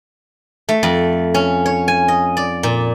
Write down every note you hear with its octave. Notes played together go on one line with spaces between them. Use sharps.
A3
F2
C#4
C#5
G#5
D#5
D5
A#2